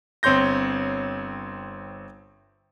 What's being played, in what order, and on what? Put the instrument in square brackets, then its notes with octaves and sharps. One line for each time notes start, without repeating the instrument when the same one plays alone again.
[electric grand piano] G1 C4 C#5 C6 G6 A#6